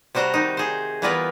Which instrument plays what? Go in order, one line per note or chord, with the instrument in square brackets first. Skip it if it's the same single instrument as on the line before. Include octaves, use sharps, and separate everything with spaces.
[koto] C3 G3 F#4 C5 A#5
C3 D#3 D#4
G#4 C5
E3 G3 B3 F4 A#4 B4